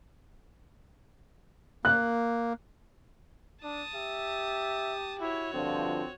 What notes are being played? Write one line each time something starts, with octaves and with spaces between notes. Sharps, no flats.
A#3 F#6
D4 A5 D#6
G4 E5
E4 F#4 C#5
G2 D3 F3 C4